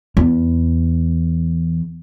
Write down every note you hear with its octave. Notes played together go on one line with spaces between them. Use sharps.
E2